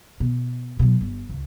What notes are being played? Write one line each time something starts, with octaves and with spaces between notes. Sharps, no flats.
B2
B2 F#3
G1
C#2